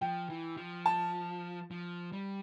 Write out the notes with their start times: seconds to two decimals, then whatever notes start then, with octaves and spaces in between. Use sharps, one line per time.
0.01 F3 G5
0.30 E3
0.57 F3
0.86 A5
1.71 F3
2.12 G3